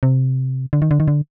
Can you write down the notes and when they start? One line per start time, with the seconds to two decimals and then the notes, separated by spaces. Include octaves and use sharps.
0.03 C3
0.73 D3
0.82 D#3
0.91 D3
1.00 D#3
1.08 D3